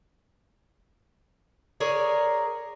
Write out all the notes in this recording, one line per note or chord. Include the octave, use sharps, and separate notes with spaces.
G#4 A#4 C#5 D5